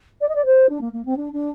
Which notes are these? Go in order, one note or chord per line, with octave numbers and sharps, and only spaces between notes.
D5
D#5
D5
C5
D4
A#3
A#3
C4
D4
D4